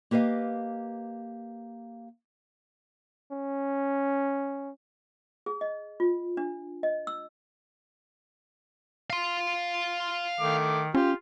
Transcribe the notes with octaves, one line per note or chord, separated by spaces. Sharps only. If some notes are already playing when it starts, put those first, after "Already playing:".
A#3 G4 B4 D#5 F5
C#4
G#4
D#5
F4
D4
D#5
E6
F5 C6
D#3 A3 D6
C#4 F4 G4